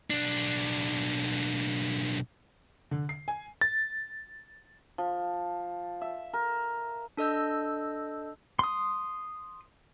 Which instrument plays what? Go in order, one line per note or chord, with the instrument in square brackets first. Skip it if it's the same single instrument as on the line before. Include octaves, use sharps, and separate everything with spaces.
[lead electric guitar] B1 D4
[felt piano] D3
C7
G#5
[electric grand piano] A6
[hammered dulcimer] F3
E5
A#4
[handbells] D4 A4 D#5 E6 G6
[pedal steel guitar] C6 D#6